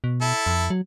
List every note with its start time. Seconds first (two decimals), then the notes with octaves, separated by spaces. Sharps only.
0.04 B2
0.21 E4 A4
0.47 F2
0.70 F#3